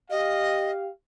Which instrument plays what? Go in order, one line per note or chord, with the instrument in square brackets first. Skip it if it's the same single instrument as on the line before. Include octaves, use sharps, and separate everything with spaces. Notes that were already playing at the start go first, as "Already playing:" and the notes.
[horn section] G4 F5 [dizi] D#5